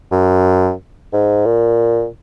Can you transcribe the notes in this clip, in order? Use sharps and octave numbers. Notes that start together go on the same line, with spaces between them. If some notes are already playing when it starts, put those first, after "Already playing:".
F#2
G#2
A#2